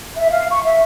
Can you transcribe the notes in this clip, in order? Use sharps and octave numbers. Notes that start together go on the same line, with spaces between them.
E5
F5
C#6
E5